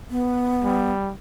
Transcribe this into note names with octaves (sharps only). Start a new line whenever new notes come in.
B3
G3